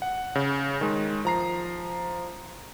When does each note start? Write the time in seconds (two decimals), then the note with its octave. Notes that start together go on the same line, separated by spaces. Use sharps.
0.02 F#5
0.35 C#3
0.81 D#3 G#3
1.25 F3 A#5 C7